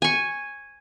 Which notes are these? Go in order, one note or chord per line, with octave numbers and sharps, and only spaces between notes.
G#5 C#6